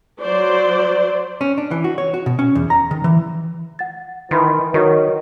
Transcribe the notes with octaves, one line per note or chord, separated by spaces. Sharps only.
F#3 C5 D5
C#4
D4
E3
F#4
C#5
F#4
B2
C#4
E2
A#5
D#3
E3
F#5 A6
D#3 E3 B5 C6 A6
D#3 F#3 A#4 D#5 C#6